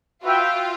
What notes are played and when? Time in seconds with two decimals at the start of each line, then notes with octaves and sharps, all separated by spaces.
0.23 F4 F#4 B4 E5 G5